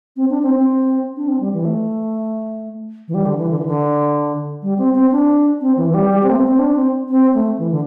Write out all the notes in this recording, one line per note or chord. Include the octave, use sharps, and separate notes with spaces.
C4
D4
C4
C4
D4
C4
G3
E3
A3
E3
G3
D3
E3
D3
E3
D3
G3
C4
C4
D4
C4
E3
E3
G3
G3
C4
A3
C4
C4
D4
C4
C4
A3
E3
D3